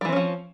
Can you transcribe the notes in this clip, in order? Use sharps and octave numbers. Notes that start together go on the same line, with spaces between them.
E3 F3 G3 C4 C#4